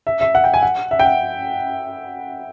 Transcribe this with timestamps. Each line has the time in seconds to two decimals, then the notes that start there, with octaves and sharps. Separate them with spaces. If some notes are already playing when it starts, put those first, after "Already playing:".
0.07 E5
0.21 E5
0.35 F#5
0.44 G5
0.54 G#5
0.62 F#5
0.91 E5
0.99 G5
1.05 F#5